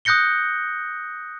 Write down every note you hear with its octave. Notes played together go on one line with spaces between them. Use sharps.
D#6 F#6 G6 A#6 C#7 G7